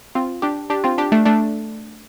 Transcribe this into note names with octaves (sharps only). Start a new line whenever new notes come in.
C4 F4
D4 G4
D4 G4
C4 F4
D4 G4
A3 D4
A3 D4